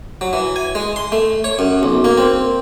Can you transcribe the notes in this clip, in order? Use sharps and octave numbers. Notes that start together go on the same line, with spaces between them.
F#3
E3
G#5
G#3
C6
A3
C#5
F#2
B1
A#3
C4